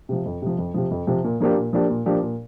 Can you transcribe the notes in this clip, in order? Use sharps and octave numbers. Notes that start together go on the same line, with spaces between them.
C3 F3
F2
C3 F3
F2
C3 F3
F2
C3 F3
A#2
F3 A#3 D4 G4
A#2
F3 A#3 D4 G4
A#2
F3 A#3 D4 G4
A#2